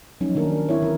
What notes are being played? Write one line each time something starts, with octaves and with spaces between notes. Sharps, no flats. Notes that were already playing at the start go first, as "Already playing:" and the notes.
F3 F#3 C#4 D#4
D#3 A#3 D4 A#4
A#4
C4 E4 C#5
E3 A#4